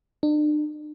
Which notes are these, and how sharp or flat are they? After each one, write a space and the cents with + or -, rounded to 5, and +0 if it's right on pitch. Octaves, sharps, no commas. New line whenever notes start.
D4 +40